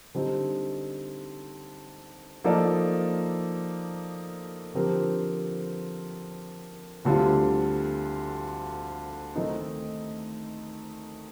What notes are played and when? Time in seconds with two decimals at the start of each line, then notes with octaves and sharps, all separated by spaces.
0.15 D3 G3 C4 D#4
2.44 F3 A#3 D#4 A4 D5
4.74 D3 F3 C4 G4 A#4
7.05 D2 D3 G3 C4 F4
9.36 D#3 A3 C4 D#4